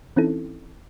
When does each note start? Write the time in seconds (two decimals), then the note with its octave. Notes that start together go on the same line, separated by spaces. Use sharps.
0.16 E3 C4 C#4 D#4 E4 A4